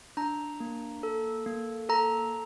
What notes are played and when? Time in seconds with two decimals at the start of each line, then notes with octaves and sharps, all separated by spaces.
0.17 D4 A#5
0.60 A#3
1.03 A4
1.46 A#3
1.89 A4 A#5